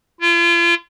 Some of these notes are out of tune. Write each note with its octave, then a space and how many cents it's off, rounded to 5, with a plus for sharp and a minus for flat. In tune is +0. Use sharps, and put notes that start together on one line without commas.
F4 -40